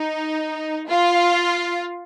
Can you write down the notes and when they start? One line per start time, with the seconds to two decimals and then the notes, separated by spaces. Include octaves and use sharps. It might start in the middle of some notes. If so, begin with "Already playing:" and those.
Already playing: D#4
0.89 F4